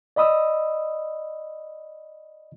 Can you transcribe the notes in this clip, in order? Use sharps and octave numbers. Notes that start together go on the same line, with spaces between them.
D5 D#5 B5 D#6 E6